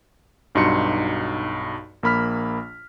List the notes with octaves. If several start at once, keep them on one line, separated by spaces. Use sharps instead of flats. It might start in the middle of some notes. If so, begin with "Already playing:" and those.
B1 G2 D#4 F#4 C6 C#7
A#1 A#3 B5 F6 B6